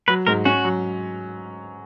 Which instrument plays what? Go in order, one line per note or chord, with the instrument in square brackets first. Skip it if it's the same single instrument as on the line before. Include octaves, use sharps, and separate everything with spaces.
[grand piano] F#3 [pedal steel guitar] B4
[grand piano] G#2 [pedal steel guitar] A#4
[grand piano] C#4 [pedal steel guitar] F#4
[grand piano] F#3